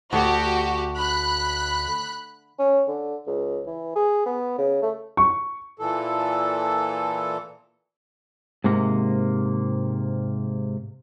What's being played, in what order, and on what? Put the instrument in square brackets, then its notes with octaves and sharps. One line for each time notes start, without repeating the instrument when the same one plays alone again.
[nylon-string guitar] D2 [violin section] F#4 G4
[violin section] B5 F#6
[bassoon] C#4
D3
C#2
E3
G#4
B3
C#3
A3
[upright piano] C#6
[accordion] A#2 E3 A4
[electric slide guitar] G#2 C3 A#3